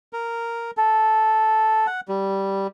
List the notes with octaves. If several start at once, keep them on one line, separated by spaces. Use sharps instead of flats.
A#4
A4
F#5
G3